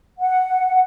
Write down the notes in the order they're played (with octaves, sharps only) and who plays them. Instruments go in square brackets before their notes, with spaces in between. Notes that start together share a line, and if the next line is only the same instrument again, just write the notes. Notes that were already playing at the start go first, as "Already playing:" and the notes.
[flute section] F#5